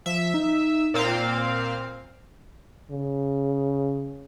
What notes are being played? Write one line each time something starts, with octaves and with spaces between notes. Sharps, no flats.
F3 E5
D#4
A#2 C4 A#4 F5
C5
C#3